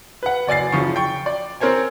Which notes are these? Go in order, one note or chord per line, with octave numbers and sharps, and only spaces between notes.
B4 F#5
F#1 D5 G#5 A6 C7
F#1 C#3 F3 F4 C#6
G5 C#6
D5
C4 A#4 C5 C#5 G#5